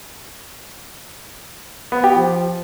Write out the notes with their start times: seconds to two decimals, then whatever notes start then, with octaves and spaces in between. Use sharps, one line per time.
1.92 B3
2.04 G4
2.15 F3